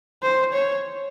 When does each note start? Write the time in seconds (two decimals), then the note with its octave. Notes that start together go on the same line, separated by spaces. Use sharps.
0.22 C5
0.53 C#5